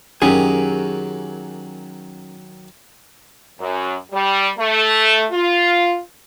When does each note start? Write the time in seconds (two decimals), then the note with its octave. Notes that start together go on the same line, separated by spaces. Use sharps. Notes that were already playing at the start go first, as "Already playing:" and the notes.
0.22 F#2 D#3 F#3 G4 G#4
3.59 F#2
4.12 G3
4.59 A3
5.31 F4